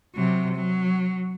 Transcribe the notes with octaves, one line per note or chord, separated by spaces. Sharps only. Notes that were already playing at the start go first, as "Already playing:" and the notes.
C3 F#3
F#3